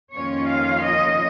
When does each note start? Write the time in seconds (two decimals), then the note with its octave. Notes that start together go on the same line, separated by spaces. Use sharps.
0.14 F2 D#3 A#3 C#4 F4 C#5
0.50 F5
0.86 D#5